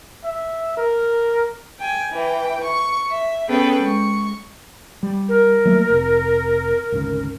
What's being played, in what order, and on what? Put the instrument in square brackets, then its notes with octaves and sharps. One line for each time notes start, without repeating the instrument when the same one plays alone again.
[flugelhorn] E5
A#4
[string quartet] G5 G#5
E3 G5
C#6
E5
B3 C#4 G#4 A4 B4 G5
G#3 C#6
[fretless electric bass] G3
[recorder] A#4
[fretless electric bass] F#3 A3 A#3
F1 C3
G#1 D2 C#3